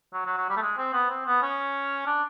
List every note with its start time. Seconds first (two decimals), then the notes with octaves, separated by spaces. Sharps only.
0.13 F#3
0.25 F#3
0.37 F#3
0.49 G3
0.57 A3
0.61 G#3
0.77 C4
0.93 B3
1.10 C4
1.26 B3
1.42 C#4
2.06 D4